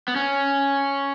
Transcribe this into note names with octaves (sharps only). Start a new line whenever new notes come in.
B3
C#4